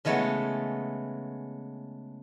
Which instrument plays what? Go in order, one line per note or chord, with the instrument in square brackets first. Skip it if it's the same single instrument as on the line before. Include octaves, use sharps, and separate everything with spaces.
[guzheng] C#3 E3 G#3 A3 B3